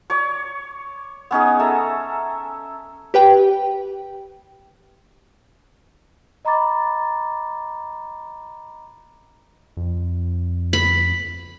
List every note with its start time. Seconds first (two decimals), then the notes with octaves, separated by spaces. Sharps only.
0.10 C#5 D5 D6
1.31 B3 C#4 D#4 G#4
1.59 A4 E5 A#5
3.14 G4 B4 G5
6.45 D#5 A#5 B5 D6 A6
9.77 F2
10.73 B5